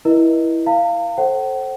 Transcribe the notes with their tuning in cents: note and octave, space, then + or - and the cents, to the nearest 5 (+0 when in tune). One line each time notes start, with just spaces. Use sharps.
E4 +0 B4 -45 D#5 +0
F5 -15 A#5 -45
A4 +0 C5 +20 F#5 +45